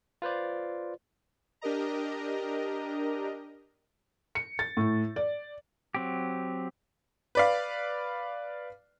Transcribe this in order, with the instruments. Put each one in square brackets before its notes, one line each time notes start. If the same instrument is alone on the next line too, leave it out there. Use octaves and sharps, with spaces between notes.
[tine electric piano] F4 B4 C5 D5
[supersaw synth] D4 G4 A#4 D#5 A#5
[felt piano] C#7
A6
A2
D5
[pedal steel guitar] F#3 C4 G4
[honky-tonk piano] B4 D5 F5